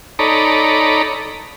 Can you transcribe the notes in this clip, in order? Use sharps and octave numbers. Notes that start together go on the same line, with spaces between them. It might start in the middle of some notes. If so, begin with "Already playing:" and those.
D#4 A4 C#5 D5 A#5 B5